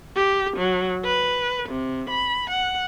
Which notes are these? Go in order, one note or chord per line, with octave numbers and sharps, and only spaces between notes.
G4
F#3
B4
C3
B5
F#5